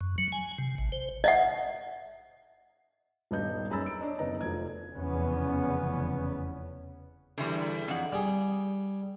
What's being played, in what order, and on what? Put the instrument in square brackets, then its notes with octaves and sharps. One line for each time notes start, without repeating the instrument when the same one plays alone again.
[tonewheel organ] F#2
F#3
G#5
C3
A1
C5
[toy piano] D#5 E5 F#5
[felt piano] D#1 G2 B3 D#4 G6
F#2 G#4 A#5 B5 E6 A6
D7
D4 C#5 D#5
F#1 B3 D#4 D#5 A#5
F1 F3 G#6
[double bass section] F1 E2 C#3 B3 C#4
[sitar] E2 [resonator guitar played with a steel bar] D3 E3 G3
[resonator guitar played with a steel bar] F2 F#5
[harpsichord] G3 G#4